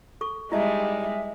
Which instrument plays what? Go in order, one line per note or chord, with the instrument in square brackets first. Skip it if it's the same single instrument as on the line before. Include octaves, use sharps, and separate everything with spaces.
[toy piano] A4 C#6
[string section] G3 D#4 [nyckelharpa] G#3 [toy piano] E4 D#5 A5 [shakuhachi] E5
[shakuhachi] E5